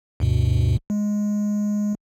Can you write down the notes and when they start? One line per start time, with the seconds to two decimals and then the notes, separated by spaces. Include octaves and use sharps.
0.20 D2 G2 B2
0.90 G#3